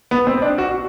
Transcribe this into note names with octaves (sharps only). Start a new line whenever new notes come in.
B3
C4
D4
F#4